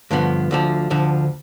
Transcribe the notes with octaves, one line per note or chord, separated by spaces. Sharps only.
G2 D3 F3 B3
D2 D3 F3
D2 D3 F3